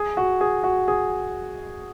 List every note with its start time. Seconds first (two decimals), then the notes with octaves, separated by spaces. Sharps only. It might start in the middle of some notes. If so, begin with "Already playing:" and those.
Already playing: G#4
0.17 F#4
0.41 G#4
0.64 F#4
0.88 G#4